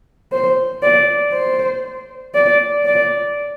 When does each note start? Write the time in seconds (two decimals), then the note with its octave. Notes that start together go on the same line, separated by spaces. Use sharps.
0.32 C5
0.83 D5
1.33 C5
2.35 D5
2.86 D5